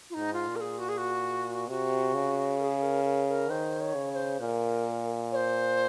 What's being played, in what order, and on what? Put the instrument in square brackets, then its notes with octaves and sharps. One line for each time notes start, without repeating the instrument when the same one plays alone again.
[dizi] F4
[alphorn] G#2 [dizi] D#4
[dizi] F4
[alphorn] A#2
[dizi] A#4
G#4
F#4
G#4
F#4
[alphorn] C3 [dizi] F#4
[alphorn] C#3
[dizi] A#4
G#4
A#4
A#4
A#4
[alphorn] D#3 [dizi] C5
[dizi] C#5
[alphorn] C#3
[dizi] C#5
C5
[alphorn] A#2 [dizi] A#4
[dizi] C#5
C5